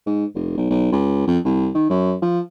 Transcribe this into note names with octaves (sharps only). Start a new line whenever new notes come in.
G#2
F1
B1
B1
C#2
F2
C2
D#3
F#2
F3